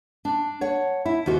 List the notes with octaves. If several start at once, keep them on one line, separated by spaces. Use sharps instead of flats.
D4
C#5 F#5
E4
D#2 D#3 F#4 C5